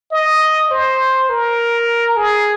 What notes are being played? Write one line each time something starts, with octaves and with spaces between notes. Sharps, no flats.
D#5
C5
A#4
G#4